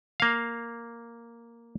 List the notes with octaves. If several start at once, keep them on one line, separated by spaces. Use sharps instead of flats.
A#3 F5